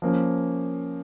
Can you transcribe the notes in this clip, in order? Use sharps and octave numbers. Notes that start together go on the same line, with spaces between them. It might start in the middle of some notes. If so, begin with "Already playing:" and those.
F3 A#3 C#4